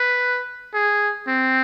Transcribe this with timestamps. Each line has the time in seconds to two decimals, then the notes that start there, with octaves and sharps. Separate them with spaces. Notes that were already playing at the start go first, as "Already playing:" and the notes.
Already playing: B4
0.74 G#4
1.27 C4